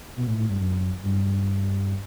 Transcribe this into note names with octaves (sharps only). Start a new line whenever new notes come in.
B2
A2
A2
G2
F#2
G2